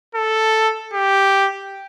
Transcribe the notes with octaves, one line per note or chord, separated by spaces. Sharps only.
A4
G4